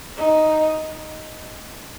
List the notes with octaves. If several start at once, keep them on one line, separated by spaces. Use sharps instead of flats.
D#4